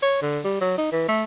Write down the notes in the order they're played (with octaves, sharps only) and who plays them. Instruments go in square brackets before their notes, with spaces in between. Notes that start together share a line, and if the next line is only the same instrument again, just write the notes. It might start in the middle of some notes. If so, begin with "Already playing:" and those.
[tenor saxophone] C#5
D3
G3
F#3
D#4
E3
A3